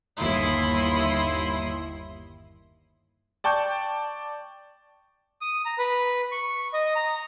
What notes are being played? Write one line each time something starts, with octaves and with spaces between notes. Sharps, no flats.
G1 D#2 E4 C6 D#6
D5 G5 A5 C#6 G6
D#6
A#5
B4
C#6
D#5
A#5